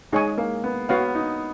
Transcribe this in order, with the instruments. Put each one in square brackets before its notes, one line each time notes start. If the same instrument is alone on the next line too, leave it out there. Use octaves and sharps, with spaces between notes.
[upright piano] G#3 [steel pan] D#4 G#4 C#5 G#5 C#6
[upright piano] A#3
B3
[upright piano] B3 [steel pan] F#4 C#5 F5
[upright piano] D#4